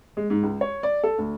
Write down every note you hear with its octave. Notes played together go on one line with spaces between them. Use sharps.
G#3
G#2
C#2
C#5
D5
A4
D2